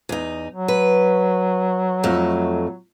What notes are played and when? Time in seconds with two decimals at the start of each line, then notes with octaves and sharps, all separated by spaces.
0.09 E2 D#4
0.51 F#3
0.68 B4
2.03 F2 A3 D#4